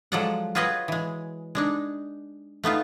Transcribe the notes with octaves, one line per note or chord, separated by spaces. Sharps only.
F3 F#3 G#3 A4 D5 F#5
F4 F#4 G#4 B4 C#5 D#5
E3 G#3
G#3 D4 D#4
A3 B3 D#4 F4